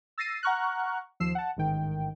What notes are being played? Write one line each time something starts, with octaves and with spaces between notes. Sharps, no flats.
E6 A6 A#6 C7 D#7
F#5 A#5 C#6 F6 F#6
D#2 F3 E6 C7 E7
F#5 A5
A1 G#2 D#3 G5